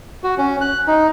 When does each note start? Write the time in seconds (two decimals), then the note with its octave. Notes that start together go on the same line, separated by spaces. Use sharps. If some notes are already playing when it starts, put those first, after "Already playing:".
0.23 F#4
0.38 C#4
0.61 F#6
0.87 D#4